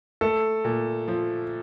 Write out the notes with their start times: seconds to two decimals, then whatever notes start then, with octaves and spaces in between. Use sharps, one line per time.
0.21 A3 A4
0.65 A#2
1.08 F3